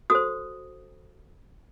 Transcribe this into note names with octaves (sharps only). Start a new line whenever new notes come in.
F#4 A4 C5 D#6